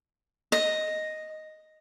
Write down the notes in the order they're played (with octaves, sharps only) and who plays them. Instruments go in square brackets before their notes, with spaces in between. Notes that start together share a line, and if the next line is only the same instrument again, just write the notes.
[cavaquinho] D#5